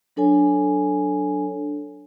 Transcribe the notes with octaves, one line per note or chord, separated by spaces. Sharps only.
F#3 D4 A4 C#5 G#5